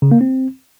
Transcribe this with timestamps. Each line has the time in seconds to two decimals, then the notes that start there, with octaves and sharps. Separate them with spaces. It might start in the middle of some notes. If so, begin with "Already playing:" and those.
0.02 C#3
0.11 A#3
0.21 C4